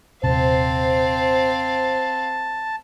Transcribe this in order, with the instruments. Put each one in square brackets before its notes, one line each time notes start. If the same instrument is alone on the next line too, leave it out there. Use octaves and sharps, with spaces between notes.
[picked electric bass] D#1 C3 [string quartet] C4 F5 [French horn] C5 [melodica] A5